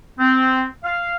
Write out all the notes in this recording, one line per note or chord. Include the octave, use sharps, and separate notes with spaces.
C4
F5